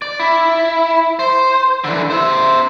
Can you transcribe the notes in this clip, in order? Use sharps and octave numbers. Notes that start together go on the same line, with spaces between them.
D5
E4
C5
D3 E3
C5 E5